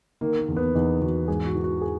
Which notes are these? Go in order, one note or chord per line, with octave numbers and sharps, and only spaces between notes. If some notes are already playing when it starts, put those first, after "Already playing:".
D#3 A#3
A#3
E2
B3
E2 D#4
E2 F#4
G#2 G#4
F#4
E3
F#4
G#4